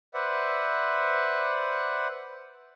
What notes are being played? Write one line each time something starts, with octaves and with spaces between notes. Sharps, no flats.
B4 C5 D5 E5 F#5